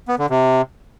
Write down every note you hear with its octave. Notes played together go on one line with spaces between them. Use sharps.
B3
D3
C3